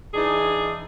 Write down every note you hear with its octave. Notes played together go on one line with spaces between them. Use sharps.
E3 D4 D#4 G#4